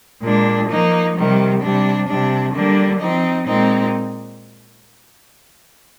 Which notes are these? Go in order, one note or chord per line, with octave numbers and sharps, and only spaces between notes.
A#2 G#3 D4
F3 A#3 D#4
C3 D#3 G3
C3 G3 D4
C3 G3 D4
D3 G3 A#3 D4
F3 C4 D#4
A#2 G#3 C4 D#4